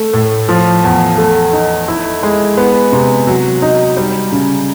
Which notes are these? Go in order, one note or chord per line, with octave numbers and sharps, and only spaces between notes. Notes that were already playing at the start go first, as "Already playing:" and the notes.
Already playing: A3
A2
F3
E2
A3
D#4
E4
G#3
B3
C3
F#3
D#4
G3
C#3